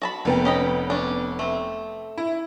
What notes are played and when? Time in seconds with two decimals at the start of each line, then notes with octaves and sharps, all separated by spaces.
0.02 F#4 A5 B5
0.25 F1 B3 G5
0.45 C#4 D#5 B5
0.90 C#4 D4
1.39 A3 C4
2.18 E4